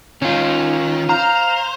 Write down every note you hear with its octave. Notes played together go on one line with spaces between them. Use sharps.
D#3 C#4 F4
C5 F5 A#5